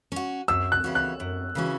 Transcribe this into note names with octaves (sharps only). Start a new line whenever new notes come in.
C#4 F#4
F#2 E6
F#6
C#3 E3 C#4 F#4
F#6
F#2
C#3 E3 C#4 F#4